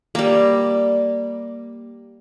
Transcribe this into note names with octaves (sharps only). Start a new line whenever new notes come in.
G3 A#3